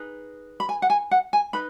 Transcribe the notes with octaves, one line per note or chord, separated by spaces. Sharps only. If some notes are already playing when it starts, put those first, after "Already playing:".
Already playing: D#4 G#4 B4
B5
G#5
F#5
G#5
F#5
G#5
D#4 B4 B5